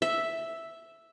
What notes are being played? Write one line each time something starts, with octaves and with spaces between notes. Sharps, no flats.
E5